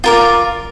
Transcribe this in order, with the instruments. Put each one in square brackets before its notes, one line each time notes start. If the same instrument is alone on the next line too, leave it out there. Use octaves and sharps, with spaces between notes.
[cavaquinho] F4 A#4 D5